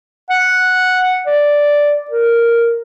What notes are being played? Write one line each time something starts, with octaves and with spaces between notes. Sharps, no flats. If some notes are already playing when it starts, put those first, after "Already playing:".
F#5
D5
A#4